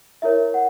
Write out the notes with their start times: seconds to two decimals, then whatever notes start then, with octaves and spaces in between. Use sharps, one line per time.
0.22 E4 A#4 C#5 E5
0.54 F#5